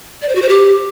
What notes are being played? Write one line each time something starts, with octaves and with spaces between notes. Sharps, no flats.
D5
C5
F#4
C5
G4